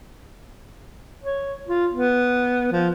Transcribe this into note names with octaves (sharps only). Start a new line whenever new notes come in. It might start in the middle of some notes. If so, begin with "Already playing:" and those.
C#5
F4
B3
F3